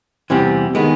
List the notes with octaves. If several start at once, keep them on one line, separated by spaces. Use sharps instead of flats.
E2 C3 E3 G3 C4
D#3 G#3 B3